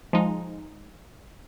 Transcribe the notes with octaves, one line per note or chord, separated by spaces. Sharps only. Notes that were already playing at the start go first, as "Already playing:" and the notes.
F3 G#3 D#4